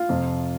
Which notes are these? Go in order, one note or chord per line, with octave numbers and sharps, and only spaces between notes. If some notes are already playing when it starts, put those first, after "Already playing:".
Already playing: F4
F2 C3 F3